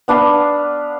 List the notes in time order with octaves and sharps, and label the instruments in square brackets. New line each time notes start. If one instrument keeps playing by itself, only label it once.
[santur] B3 D4 B4 F5